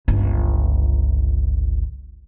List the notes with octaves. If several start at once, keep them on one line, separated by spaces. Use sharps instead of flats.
G1 C#2